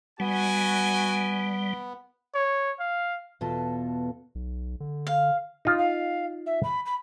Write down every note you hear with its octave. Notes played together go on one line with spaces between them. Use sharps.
G3 B3 F#4 G#5
C#5
F5
E2 B2 F4 A4 A5
B1
D3
F5
D#4 F4
F5
E5
B5
B5